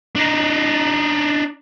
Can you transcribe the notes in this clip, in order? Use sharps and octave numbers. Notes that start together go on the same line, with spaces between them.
D4 D#4